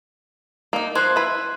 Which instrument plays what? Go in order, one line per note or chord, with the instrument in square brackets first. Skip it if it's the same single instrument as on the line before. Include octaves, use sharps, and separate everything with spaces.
[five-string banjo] A#3 D#4
[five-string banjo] F3 C5 [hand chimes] C6 F#6 G#6
[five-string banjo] E4 B4